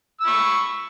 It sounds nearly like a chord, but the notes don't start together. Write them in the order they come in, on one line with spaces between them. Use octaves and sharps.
E6 B5 C#6